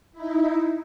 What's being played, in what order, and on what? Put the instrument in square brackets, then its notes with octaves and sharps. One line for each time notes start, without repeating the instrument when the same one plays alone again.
[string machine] D#4 E4